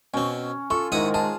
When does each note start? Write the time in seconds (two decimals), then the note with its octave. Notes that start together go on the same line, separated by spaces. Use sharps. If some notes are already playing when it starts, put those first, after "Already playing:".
0.14 B2 C4 C#4
0.70 F4 A4 C#6
0.92 G#2 D#3 G#3 E4 F#5 D#6
1.14 G#4 A5